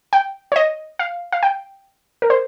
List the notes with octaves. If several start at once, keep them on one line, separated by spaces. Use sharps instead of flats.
G5
C#5
D#5
F5
F5
G5
A#4
C5